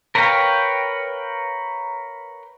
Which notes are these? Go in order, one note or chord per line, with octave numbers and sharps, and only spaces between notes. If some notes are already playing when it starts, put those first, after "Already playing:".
A#4 B4 C#5 F5 G5